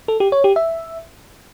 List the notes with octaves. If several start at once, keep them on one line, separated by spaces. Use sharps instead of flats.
A4
G4
C#5
G4
E5